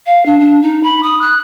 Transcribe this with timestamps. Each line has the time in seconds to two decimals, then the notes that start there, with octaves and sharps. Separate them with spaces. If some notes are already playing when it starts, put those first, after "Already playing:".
0.06 F5
0.26 D4
0.40 D4
0.62 D#4
0.83 B5
1.03 D#6
1.21 F#6